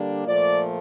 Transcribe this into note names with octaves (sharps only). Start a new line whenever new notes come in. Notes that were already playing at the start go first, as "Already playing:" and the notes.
Already playing: D3 G3 A#3 D4
A#2 F3 A3 D5